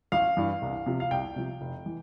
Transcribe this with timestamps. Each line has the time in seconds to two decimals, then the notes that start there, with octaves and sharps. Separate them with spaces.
0.12 A1 F5
0.37 G2 E3
0.62 C2
0.86 C3 F3
1.00 F5
1.11 C2 G5
1.36 C3 F3
1.61 F1
1.86 E3